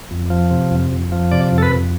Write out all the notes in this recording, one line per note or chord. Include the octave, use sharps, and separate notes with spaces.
F2
F3
C3
F2
F2
F3
C3 D5
F2
A4
B4
F2